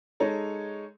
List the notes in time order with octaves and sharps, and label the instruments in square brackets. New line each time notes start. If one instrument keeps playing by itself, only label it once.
[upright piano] G#3 D#4 A4 C#5